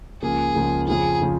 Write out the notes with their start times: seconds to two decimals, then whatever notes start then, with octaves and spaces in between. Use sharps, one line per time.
0.22 C#2 C#3 F3 A#3 G#4
0.55 C#2 C#3 F3 A#3
0.87 F2 C#3 F3 G#4
1.22 C#3 F3